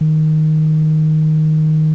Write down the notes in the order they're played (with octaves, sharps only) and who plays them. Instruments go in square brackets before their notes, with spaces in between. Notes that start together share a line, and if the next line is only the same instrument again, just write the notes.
[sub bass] D#3